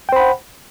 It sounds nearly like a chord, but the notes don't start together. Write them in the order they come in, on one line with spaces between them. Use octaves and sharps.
G5 C5 B5 F#5